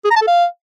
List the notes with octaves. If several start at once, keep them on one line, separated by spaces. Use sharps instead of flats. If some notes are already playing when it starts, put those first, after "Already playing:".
G#4
A#5
A5
A4
F5